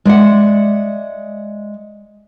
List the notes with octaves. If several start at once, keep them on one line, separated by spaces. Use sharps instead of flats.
G#3 D5 E5 F#5